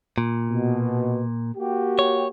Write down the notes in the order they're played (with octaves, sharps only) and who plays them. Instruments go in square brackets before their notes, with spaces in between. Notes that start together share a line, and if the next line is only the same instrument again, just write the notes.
[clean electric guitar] A#2
[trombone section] B2
A#3 F#4 G4
[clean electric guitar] C#5